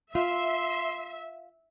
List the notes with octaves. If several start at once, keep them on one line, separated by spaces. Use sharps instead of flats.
F4 E5 C6